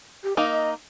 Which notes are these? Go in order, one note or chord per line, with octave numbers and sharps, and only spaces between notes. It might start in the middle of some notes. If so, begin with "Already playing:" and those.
G4
A#3 D#4 D#5